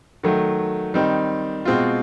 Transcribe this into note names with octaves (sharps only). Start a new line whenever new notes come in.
D#3 F#3 A3
D#3 G3 C4 D#4
B2 G#3 C4 F4